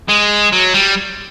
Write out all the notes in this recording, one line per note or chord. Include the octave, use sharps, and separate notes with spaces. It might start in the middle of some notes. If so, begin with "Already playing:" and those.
G#3
F#3
G3